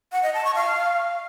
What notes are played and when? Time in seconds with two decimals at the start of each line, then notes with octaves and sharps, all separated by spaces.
0.12 F#5
0.23 D#5
0.34 A5
0.45 C#6
0.55 F5